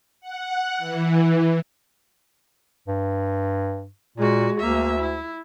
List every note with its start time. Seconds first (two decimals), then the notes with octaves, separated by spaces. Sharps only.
0.21 F#5
0.78 E3
2.88 G2
4.18 A#2 G#3 F#4
4.60 D2 A#3 E5
5.01 E4